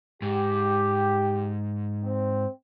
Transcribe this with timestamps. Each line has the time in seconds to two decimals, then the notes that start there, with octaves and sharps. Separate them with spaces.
0.22 G#2 G4
2.04 C4